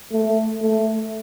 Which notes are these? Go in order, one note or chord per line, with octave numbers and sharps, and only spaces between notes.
A3
A3